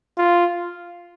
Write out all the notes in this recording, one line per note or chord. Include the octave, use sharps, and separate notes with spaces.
F4